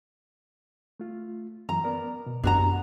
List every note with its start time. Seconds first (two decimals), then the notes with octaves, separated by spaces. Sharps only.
1.00 A3 F4
1.69 F#2 E3 A#5
1.84 B3 A#4 D5
2.26 B2
2.44 F#2 B3 D4 E4 F#4 G4 A#5